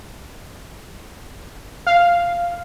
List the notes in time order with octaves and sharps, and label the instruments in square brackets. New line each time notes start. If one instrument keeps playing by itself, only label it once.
[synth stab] F5